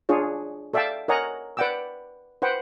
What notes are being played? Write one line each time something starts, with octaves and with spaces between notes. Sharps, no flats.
D4 F4 G#4 C#5
A4 D5 E5 F5 G5 A5
A#4 C#5 D#5 F#5 G#5 A#5
B4 D5 F#5 G5 D6 E6
B4 C5 F#5 G5